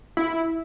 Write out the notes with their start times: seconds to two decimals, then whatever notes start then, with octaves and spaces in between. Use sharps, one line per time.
0.17 E4